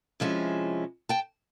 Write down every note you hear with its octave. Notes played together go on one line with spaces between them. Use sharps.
C3 F3 G#3 C#4 E4
G5 A5